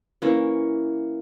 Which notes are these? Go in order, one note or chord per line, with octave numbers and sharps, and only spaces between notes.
E3 A#3 C#4